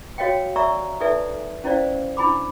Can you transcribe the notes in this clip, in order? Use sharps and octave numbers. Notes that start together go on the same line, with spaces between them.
F#4 C#5 D#5 F5 G5
D5 E5 A#5 C#6 E6
D#4 A4 B4 D5 E5 G#5
C#4 E4 C5 D5 F5
D4 E4 G#5 B5 D6